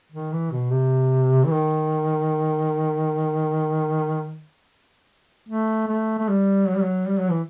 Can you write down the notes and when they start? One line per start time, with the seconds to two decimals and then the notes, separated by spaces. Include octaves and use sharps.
0.12 D#3
0.32 E3
0.52 B2
0.71 C3
1.44 E3
1.51 D#3
5.49 A3
5.88 A3
6.18 A3
6.29 G3
6.68 F#3
6.75 G3
6.82 F#3
7.08 G3
7.18 F#3
7.30 E3